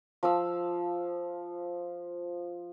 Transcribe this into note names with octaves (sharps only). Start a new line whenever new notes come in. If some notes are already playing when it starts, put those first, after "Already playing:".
F3 F5 E6